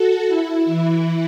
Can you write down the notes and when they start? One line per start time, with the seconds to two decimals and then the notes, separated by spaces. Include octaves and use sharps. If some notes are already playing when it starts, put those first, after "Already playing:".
Already playing: F#4 A4
0.27 E4
0.65 E3